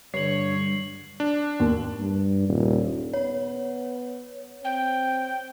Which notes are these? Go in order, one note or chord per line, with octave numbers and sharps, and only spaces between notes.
G2 D3 C#5 C7 F#7
D4
D#2
G2
D#1
B3 C#5
C4 G5